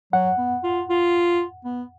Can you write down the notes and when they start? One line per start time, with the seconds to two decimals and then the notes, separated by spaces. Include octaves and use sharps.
0.13 F#3 F#5
0.38 B3
0.64 F4
0.90 F4
1.65 B3